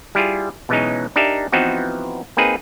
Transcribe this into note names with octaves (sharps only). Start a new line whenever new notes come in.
G3 E4 F4 G#4
B2 E3 F#3 G#3 C#4 D#4
D4 D#4 G4 A#4 E5
E3 F3 B3 C4 D#4 F#4
A#3 C4 D#4 G#4 B4